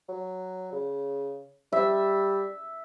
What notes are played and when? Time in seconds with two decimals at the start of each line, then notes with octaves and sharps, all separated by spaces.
0.09 F#3
0.72 C#3
1.72 G3 E5